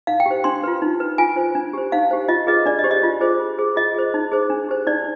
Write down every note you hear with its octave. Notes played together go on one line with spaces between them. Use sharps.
D#4 F5
G5
G4 C5
D4 C6
F4 B4
D#4
B4
F4 G#5
C5
D4
G4 C5
D#4 F5
G4 C5
F4 D#5
G#4 B4 D#5
D4 D5
D#5
G4 C5
D#5
F4
G#4 C5
F4
G#4 C5
F4 D#5
G#4 C5
D#4
G#4 C5
D4
G4 C5
D#4 D5